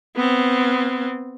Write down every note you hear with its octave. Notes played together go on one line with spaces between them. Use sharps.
B3 C4